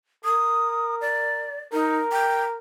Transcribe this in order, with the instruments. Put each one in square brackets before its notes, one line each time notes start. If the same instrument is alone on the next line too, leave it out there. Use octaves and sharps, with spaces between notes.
[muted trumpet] A#4 [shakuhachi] D#6
[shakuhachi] D5
[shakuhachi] D#4 [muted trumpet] A#4
[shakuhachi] G5